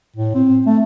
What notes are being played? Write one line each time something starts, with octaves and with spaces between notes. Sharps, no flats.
A2
C4
A3